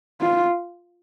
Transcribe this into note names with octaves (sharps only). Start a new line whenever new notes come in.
F4